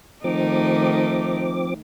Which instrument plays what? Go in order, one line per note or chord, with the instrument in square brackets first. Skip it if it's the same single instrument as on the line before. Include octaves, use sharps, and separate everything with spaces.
[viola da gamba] D#3 A3 D#4 [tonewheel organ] F3 C4 D6